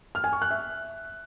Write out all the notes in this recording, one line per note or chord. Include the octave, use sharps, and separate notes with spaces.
F6
G#5
C#6
F#6
E5